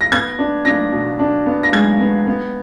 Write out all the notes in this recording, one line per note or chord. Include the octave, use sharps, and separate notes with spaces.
A#6
B3 G#6
D4
D4 A#6
B2
D4
B3
A#6
G#3 G#6
B3
B3